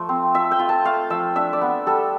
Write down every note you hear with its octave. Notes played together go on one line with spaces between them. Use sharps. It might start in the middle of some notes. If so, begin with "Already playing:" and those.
Already playing: F3 A3
C4
F4 E5
G5
F4
A5
A3 F5
F3 E5
D4 E5
D5
B3
G3 A4